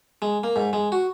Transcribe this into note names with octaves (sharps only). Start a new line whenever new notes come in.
G#3
A#3
G#2
G#3
F#4